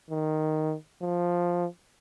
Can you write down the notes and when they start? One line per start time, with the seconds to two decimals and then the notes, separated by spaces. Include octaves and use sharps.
0.10 D#3
1.01 F3